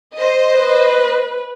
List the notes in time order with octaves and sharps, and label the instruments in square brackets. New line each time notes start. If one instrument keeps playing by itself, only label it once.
[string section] C5 D#5
[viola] B4